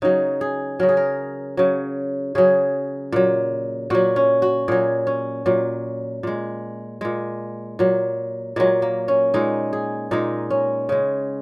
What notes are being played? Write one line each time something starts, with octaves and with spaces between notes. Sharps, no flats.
C#3 F#3 D#4
G#4
C#3 F#3 A#4
G#4
A#4
C#3 F#3
C#3 F#3 G#4
A#2 F#3
A#2 F#3 F#4
C#4
F#4
A#2 F#3 G#4
C#4
A#2 F#3
A#2 G#3
A#2 G#3
A#2 F#3
A#2 F#3 G#3
A#3
C#4
A#2 G#3 D#4
G#4
A#2 G#3 D#4
C#4
C#3 G#3